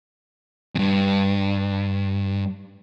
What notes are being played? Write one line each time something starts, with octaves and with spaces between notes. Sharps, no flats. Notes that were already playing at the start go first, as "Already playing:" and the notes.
E2 G2